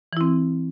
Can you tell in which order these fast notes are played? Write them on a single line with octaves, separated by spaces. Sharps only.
E3 E4 C4